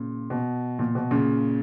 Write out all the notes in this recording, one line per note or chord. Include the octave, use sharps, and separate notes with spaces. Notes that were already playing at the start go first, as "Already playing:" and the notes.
Already playing: A#2 C#3
B2
A#2
B2
A#2 C#3